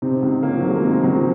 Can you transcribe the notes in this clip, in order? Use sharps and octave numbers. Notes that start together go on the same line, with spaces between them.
C3 C4 D#4
C#2
C#2 A#3 C#4
F3
F#3
D#3 G#3
A#3
C3 G#3 C4
C#2 F#3
F3